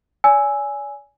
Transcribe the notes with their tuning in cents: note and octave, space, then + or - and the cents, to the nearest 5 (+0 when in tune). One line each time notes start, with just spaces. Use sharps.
D5 -45 G#5 +5 E6 -5